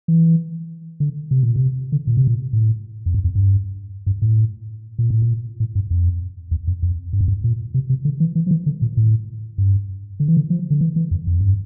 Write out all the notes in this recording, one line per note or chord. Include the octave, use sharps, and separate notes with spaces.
E3
D3
C3
A#2
C3
D3
A#2
C3
A#2
A2
F2
G2
F2
G2
G2
A2
A#2
A2
A#2
A2
G2
F2
E2
F2
F2
G2
F2
G2
A#2
C3
C3
D3
E3
E3
F3
E3
D3
A#2
A2
G2
D3
E3
D3
F3
D3
E3
E3
F2
F2
G2